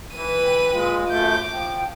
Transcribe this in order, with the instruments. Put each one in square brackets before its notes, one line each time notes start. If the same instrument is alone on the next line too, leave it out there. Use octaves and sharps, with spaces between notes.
[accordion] E3 [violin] B4 D#7
[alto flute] G5
[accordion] A#2 G#3 [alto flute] F4
[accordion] F#2 A3 G6 [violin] D6
[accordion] F3 [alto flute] G5